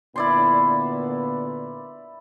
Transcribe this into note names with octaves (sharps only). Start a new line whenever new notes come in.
A#2 D3 B3 E4 D5 C6